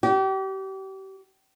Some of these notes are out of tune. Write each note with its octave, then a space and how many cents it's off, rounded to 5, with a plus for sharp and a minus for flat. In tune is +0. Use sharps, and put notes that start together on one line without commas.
G4 -35